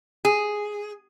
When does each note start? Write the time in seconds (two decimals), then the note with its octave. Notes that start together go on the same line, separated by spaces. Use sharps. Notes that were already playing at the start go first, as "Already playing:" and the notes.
0.25 G#4